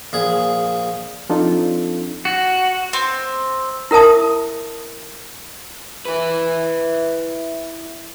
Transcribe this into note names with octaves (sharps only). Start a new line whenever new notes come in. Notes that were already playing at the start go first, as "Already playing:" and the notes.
A#1 G#4
F3 C4 D4 D#4 F4 A4
F#4
C4
E4 A#4 E5 A5 D#6
E4 B4